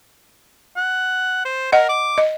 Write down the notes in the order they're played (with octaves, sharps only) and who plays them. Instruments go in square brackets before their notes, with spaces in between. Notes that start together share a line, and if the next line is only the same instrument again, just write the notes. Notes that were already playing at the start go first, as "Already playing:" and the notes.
[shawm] F#5
C5
[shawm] A#4 [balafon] D#5 F#5
[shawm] D6
[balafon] D#5